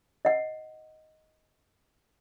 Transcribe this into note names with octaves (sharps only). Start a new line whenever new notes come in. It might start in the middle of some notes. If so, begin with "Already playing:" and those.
D#5 F#5